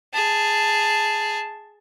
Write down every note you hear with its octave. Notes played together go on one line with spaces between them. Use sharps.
G#4 A5